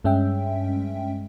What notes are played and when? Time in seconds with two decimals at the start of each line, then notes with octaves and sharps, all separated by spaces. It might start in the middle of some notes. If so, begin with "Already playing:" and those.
0.04 G2 G#3 C#4 E5 G5